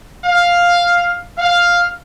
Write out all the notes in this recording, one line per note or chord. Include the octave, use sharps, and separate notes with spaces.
F5
F5